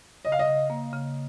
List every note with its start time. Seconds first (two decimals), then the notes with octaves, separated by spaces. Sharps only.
0.25 C#3 D#5
0.32 F5
0.39 D#5
0.48 C#3
0.70 A#3
0.93 C#3